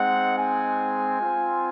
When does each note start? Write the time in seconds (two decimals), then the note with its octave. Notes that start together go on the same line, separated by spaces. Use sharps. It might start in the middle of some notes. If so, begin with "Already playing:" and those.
Already playing: G#3 C4 D#4 F#5
0.36 G#5
1.18 C4 F4